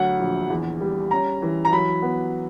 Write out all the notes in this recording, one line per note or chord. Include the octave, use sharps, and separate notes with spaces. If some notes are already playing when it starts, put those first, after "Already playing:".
Already playing: D2 F#3 F#5
A#1
E2
G3
C#4 A#5
E3
A#5
F#3 B5
B3